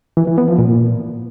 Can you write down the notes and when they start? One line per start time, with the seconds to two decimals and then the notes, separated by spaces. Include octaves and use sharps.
0.17 E3
0.27 E3
0.38 B3
0.48 F3
0.59 A#2